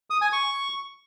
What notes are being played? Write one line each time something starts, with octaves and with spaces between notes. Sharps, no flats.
D#6
G#5
C#6